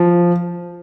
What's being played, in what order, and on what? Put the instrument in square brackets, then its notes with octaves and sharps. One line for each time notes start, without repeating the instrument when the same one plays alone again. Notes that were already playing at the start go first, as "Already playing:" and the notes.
Already playing: [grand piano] F3